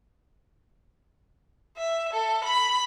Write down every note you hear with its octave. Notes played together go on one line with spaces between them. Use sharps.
E5
A4
B5